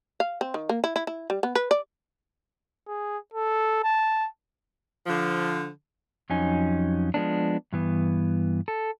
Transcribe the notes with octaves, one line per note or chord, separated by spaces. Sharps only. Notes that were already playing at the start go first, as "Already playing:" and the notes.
F5
C4
D#3
A#3
E4
E4
E4
G3
B3
B4
D5
G#4
A4
A5
D3 F3
F2 F#3 C#4 D#4 G#5
F3 G#3 B3 D4
G2 E3 B3
A4